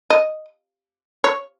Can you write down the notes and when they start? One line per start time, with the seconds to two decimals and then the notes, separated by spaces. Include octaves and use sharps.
0.10 D#5
1.24 C#5